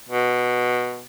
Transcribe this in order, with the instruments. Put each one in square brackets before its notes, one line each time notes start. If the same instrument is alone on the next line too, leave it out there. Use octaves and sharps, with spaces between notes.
[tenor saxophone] B2